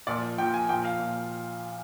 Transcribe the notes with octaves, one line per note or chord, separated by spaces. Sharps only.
A#2 F3 D5
A#2 F3 G5
G#5
A#2 F3 G5
F5
A#2